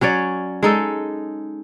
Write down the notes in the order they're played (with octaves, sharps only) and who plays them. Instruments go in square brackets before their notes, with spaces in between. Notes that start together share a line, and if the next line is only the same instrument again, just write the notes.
[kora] F#3 C#4 C#5 D5
G#3 D#4 A4